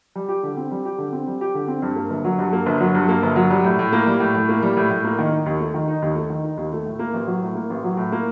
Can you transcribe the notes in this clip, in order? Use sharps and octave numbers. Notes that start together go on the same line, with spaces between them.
G3
G4
D3
C4
G3
G4
D3
C4
G3
G4
D3
C4
G2
A#3
G1
F#3
G2
A#3
G1
F#3
G2
A#3
G1
F#3
G3
A2
A2
A#3
G3
A2
A2
A#3
G3
A2
A2
A#3
D#3
D#4
D#2
A3
D#3
D#4
D#2
A3
D#3
D#4
D#2
A3
A2
A#3
A1
F#3
A2
A#3
A1
F#3
A2
A#3